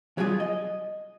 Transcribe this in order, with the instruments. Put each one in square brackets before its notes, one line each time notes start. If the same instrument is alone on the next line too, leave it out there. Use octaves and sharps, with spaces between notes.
[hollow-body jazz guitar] C2 F#3 G3 F4 G#4
D#5